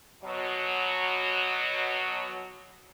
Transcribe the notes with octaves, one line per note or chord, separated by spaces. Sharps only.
B2 F#3